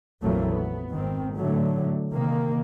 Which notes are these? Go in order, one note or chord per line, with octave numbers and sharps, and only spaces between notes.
A#1 F2 E3 F#3 A3 A#3
B3
G#1 D#3 C4
A2 D3 F#3 A3
C3 D#3 A#3